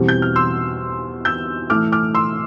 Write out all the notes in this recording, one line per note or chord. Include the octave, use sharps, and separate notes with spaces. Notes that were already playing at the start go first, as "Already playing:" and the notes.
Already playing: E2 B2 G3 C4
G6
F6
C6 E6
E6 G6
A2 E3 A3 D6 F6
D6 F6
C6 E6